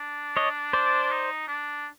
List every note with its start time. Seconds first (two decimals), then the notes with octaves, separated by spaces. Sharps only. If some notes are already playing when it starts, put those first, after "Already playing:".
Already playing: D4
0.37 C#5 D#5
0.73 C5 D5
1.10 D#4
1.48 D4